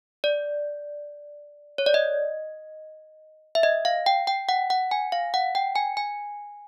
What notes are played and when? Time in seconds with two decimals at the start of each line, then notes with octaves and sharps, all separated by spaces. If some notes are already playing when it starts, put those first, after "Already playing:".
0.24 D5
1.78 C#5
1.86 D5
1.94 D#5
3.55 E5
3.63 D#5
3.85 F5
4.06 G5
4.27 G5
4.49 F#5
4.70 F#5
4.91 G#5
5.12 F5
5.34 F#5
5.55 G5
5.76 G#5
5.97 G#5